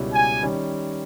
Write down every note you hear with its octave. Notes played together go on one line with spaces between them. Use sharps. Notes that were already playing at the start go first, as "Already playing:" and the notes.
Already playing: C#2 B2 G3 C#4 E4
G#5
D#3 G3 C#4